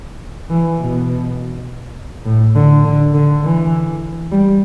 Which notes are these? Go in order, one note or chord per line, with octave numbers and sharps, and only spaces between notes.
E3
B2
A2
D3
D3
D3
E3
G3